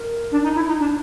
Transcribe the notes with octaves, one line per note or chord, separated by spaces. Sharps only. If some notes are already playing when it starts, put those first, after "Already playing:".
Already playing: A#4
D4
D#4
E4
D#4
D4